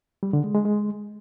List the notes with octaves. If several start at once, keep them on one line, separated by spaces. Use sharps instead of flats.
G3
D3
G#3
G#3
G#3